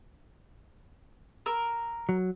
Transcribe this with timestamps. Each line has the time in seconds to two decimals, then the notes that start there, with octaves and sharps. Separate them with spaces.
1.46 A#4 E6
2.09 F#3